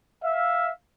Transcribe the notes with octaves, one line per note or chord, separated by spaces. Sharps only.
E5 F5